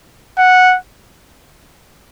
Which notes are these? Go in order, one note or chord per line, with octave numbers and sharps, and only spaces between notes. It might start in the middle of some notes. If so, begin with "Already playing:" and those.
F#5